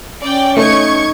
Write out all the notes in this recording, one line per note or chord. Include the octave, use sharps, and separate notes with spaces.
C#4 D5 G5
A3 D#4 C#6 G#6